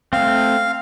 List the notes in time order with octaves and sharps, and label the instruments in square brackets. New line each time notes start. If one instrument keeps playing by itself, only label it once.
[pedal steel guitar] A3 C4 [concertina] F5